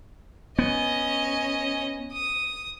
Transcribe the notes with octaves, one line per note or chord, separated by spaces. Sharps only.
B3 C#4 D#5
D#6